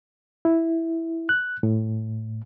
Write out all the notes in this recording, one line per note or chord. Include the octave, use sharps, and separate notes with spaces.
E4
F#6
A2